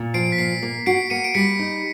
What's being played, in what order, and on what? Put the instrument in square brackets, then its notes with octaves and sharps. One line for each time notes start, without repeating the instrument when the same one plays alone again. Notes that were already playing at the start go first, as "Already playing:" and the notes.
Already playing: [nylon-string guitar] A#2
[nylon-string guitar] F3 [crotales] C7 D7
[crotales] B6
[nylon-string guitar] A#2 [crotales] C7
[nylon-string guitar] A#3
[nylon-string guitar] F#4 [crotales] C7 D7
[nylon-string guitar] A#3 [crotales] C#7 D#7
[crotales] D7
[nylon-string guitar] G3 [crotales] B6 C#7
[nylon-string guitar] D#4